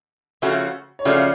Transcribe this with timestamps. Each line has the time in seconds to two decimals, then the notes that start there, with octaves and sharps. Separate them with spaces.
0.42 C#3 F3 A3 C#4 F#4
0.99 C#5
1.05 C#3 F3 A3 C#4 F#4 D5